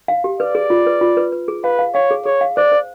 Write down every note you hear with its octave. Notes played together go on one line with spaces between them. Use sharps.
F5
G4
B4 D5
G#4
F4
B4
F4
B4
B4
G#4
B4 F5
F5
C#5 F5
G#4
G#4 C#5
F5
C5 D5
C5